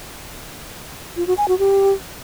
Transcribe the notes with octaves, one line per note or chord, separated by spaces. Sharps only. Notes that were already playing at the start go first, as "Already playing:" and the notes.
F4
F#4
G#5
F#4
G4